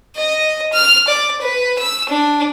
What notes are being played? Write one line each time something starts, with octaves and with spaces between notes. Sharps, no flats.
D#5
F6
D5
B4
E6
D4